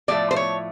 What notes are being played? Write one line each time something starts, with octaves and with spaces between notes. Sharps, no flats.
A2 F3 A3 D5
C5
C#5